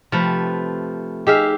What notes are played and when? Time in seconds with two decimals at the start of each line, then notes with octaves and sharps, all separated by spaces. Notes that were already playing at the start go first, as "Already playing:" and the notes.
0.12 C3 F3 A3 B4
1.27 D#4 G4 G#4 E5 F5